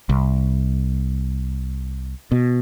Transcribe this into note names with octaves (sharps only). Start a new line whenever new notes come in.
C2
B2